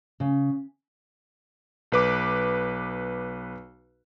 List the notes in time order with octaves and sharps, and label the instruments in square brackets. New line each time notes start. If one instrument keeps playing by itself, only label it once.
[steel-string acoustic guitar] C#3
[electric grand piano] B1 B4 D6